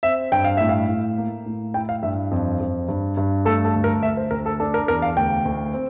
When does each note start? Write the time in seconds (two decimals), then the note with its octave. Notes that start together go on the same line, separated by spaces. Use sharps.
0.03 C4 E5
0.32 G2 G5
0.44 F5
0.57 A2 E5
0.69 F5
0.89 A2
1.18 A#3
1.46 A2
1.74 E4 G5
1.89 F5
2.03 G2 E5
2.31 F2
2.60 F2
2.89 G2
3.17 G2
3.45 A3 A4
3.64 A4
3.75 D2
3.84 A#4
4.02 D2 E5
4.17 C5
4.31 D2 A#4
4.46 A4
4.60 D4 A4
4.74 A#4
4.88 E2 A#4
5.02 F5
5.17 D2 G5
5.45 D2
5.74 C4